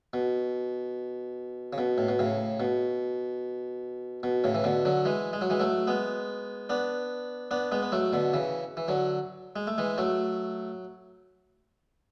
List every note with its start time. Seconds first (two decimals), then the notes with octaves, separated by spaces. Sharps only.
0.13 B2
1.73 C#3
1.78 B2
1.98 A2
2.09 B2
2.19 A2 C#3
2.60 B2
4.23 B2
4.44 A2 C#3
4.55 E3
4.64 B2 D3
4.85 D3 F#3
5.05 E3 G#3
5.33 G#3
5.41 F#3
5.50 E3 G#3
5.60 F#3 A3
5.87 G#3 B3
6.69 B3 D4
7.51 B3 D4
7.72 G#3 B3
7.82 B3
7.92 F#3 A3
8.13 B2 D3
8.33 C#3 E3
8.77 E3
8.88 D3 F#3
9.56 G#3
9.67 A3
9.78 E3 G#3
9.98 F#3 A3